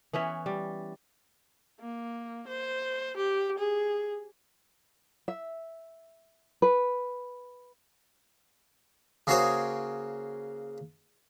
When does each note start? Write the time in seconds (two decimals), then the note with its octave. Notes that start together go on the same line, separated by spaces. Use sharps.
0.13 E3 B3 C#4 E5
0.46 G3
1.80 A#3
2.48 C5
3.17 G4
3.59 G#4
5.28 E5
6.62 B4
9.27 C#3 A#3 F#4 C5 C#5 D#6